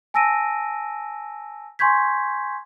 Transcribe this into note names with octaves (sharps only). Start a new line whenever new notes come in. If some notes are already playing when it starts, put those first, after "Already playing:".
G#5 A5 E6 A#6 D7 D#7
G#5 C6 C#6 G6 G#6 B6